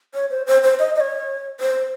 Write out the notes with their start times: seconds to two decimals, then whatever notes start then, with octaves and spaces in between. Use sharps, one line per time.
0.14 C#5
0.30 C5
0.47 C5
0.63 C5
0.79 D#5
0.95 D#5
1.00 C#5
1.60 C5